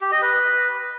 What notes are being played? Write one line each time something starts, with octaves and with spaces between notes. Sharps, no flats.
G4
D#5
B4